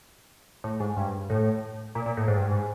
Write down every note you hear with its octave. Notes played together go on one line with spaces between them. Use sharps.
A2
G#2
G2
A2
A#2
A#2
A2
G#2
G2
G#2